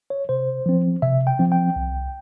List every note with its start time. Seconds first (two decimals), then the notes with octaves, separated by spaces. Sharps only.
0.10 C#5
0.29 C3 C5
0.66 F3 C4
1.02 C3 E5
1.27 G5
1.39 F3 C4
1.52 G5
1.76 C2